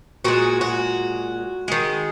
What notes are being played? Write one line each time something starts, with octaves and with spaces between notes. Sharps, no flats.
A#2 G#3 F#4
F#4
D#3 G#3